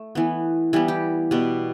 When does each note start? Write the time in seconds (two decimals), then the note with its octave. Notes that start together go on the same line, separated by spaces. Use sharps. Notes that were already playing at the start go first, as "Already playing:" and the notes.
Already playing: A3
0.15 E3 B3
0.73 E3 G3 B3 E4
0.88 G4
1.31 B2 G3 B3